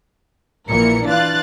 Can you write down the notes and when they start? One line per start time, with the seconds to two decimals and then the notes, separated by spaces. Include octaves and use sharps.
0.69 A#1 A#2 E3 A#4 C#7
1.08 E3 D4 F4 F5 F#6 A6